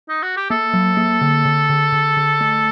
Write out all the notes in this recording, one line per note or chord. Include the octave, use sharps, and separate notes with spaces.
D#4
F#4
G4
A#3 A4
F#3
A#3
D3
D3
D3
D3
D3
A3